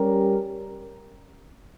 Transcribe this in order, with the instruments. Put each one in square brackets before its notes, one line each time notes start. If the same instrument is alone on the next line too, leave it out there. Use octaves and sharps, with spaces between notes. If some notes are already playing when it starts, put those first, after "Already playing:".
Already playing: [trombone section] G3 C#4 G4 A#4